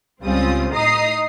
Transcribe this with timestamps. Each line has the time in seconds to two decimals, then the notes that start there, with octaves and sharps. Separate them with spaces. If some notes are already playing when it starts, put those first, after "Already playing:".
0.23 C#2 G3 C4 C#4 F4 D#6
0.73 A2 D#4 D#5 A#5 D#6 C7